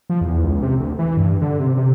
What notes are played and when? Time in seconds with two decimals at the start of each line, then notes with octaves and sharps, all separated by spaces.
0.09 F3
0.21 E2
0.44 C#2
0.63 C3
0.80 D2
0.99 E3
1.17 G2
1.41 D3
1.59 C3
1.77 C3